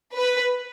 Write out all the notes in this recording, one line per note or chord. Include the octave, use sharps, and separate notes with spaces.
B4